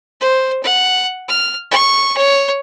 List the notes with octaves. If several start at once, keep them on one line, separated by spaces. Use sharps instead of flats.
C5
F#5
F6
C#6
C#5